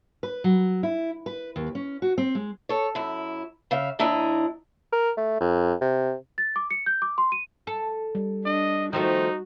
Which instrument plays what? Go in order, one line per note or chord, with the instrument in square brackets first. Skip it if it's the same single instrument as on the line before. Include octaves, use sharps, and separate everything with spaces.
[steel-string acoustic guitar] B4
F#3
E4
B4
D#2
C#4
F#4
C4
G#3
A4 C#5
F#2 E4
C#3 E5 F5
D#2 D4 E4 D#5 A#5
[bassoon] A#4
A3
F2
C3
[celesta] A6
D6
C#7
G6
D6
C6
D#7
[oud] A4
[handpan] G3
[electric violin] D4 [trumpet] D#5
[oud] D#3 F3 A3 [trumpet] D#4 [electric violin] F#4